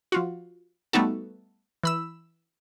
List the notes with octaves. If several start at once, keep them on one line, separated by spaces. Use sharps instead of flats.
F3 F4 F#4
G3 A3 B3 D#4 F#4 A4
E3 B5 E6